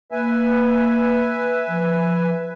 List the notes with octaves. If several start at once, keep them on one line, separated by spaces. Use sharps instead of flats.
A#3 B4 E5 G#5
F3